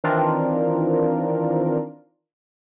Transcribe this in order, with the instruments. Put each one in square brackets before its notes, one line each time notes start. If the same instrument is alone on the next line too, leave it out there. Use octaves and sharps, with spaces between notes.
[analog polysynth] D#3 E3 C4 D4 F4 A#4